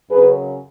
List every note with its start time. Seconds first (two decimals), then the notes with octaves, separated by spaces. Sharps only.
0.10 F#2 C#3 G#4 B4